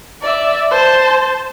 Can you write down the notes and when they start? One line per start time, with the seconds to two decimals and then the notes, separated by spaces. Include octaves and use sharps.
0.21 D5 E5
0.71 C5 A5